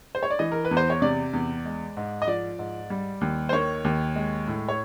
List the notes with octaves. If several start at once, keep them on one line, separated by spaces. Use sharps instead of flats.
C5
C#5
D5
E3 D#5
A#4
B4
E2
C5
C#5
C3 D5
E2
G#3
G#2
D#5
F3 D5
G#2
G3
D#2
C5
D#3 C#5
D#2
G#3
A2
C#5